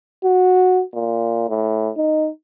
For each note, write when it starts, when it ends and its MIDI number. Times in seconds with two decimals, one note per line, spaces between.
0.24 0.82 66
0.94 1.44 46
1.49 1.90 45
1.97 2.29 63